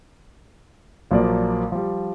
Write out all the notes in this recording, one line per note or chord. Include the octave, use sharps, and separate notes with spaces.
A#1 F3 F#3 A#3 D5
F3 G3